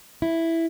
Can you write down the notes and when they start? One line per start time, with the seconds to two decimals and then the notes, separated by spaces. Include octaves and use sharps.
0.22 E4